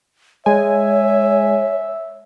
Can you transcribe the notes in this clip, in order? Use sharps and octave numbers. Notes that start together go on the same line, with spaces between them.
G#3 C#5 E5 G#5